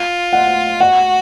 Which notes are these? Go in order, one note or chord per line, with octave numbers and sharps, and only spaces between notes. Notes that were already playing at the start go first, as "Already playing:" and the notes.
Already playing: F4
F#5
F#4 F#5